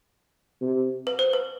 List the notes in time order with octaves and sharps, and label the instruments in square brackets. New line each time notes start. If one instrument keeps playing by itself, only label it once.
[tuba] C3
[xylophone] B4
C5
B4